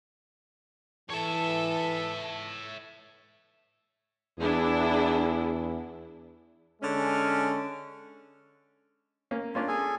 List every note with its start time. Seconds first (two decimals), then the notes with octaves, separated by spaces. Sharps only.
1.10 E3 A4 C#5 E5
4.39 E2 D4 E4 G#4
6.82 D3 G#3 C#4
9.31 A#3 C#4
9.55 A#3 C#4 D4 F4
9.68 G#4 A4 G#5